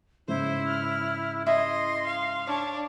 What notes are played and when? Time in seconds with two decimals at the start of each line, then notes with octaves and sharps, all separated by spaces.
0.28 G#2 C#3 E4 C5
0.67 F6
1.47 E4 D#5 C6
2.07 F5
2.47 D4 C#5